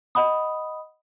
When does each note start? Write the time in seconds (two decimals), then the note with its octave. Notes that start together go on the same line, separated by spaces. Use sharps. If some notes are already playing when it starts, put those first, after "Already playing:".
0.15 D#5 F#5 B5 D#6